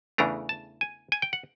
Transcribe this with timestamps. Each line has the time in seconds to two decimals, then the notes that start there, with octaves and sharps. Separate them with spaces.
0.18 E2 C#3 E3 A3 D4 A#5
0.49 A5
0.81 G#5
1.12 G#5
1.22 G5
1.33 F#5